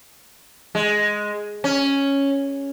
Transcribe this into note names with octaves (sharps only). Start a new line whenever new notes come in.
G#3
C#4